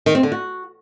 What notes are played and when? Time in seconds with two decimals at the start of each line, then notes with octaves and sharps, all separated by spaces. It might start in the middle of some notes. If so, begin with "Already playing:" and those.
0.06 D#3
0.15 C4
0.23 D3
0.32 F#4